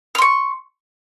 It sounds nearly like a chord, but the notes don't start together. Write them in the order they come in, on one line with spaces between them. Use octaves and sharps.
F6 C6 C#6